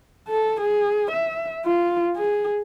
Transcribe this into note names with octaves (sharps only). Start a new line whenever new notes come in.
A4
G#4
E5
F4
G#4